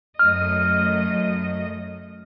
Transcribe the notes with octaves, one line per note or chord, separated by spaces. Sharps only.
F#2 A3 D#5 F6